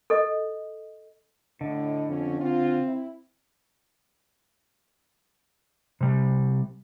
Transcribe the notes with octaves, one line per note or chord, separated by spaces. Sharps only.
A4 D#5
A2 D3 D#5
F2 C#4
C4 F4
E4
C3 G3